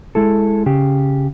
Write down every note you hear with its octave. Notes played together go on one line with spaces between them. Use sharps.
G#3 E4 A4
C#3 G4